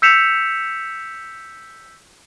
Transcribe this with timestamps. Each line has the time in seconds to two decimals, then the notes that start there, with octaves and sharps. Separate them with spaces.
0.02 E6 G6 B6 C#7 E7 F7